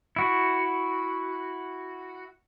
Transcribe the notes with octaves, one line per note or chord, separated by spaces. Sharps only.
E4 F#4